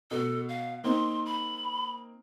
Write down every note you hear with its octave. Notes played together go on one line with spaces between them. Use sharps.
B2 A4
F5
A#3 C4 D#4 C6
B5